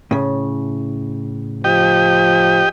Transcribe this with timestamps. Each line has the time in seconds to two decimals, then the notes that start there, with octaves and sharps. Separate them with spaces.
0.11 A2 C#3
1.64 F3 G4 D#5 G5